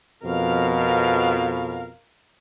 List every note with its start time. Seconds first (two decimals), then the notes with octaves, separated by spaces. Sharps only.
0.24 F2 B2 A#4 F5